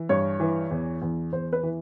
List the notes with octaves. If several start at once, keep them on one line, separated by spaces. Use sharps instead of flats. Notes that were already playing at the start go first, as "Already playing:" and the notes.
Already playing: E3
G2 C#5
E3
E2
E2
E2 C5
B4
E3